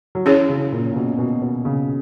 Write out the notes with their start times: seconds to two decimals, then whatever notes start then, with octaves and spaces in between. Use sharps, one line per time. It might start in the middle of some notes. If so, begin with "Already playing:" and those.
0.15 F#3
0.25 E3 C#4 E4 G#4 C#5
0.49 C#3
0.72 A#2
0.92 A#2
0.96 B2
1.18 B2
1.42 B2
1.65 C#3